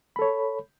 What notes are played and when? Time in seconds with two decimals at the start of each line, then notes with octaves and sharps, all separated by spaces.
0.16 B5
0.19 A4
0.22 C#5